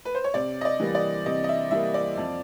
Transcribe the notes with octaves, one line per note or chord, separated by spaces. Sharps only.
B4
C5
C#5
C3 D5
D#5
D5
E3 G3 A#3
D5
C3 D#5
D#5
E5
E3 G3 A#3 E5
D5
F2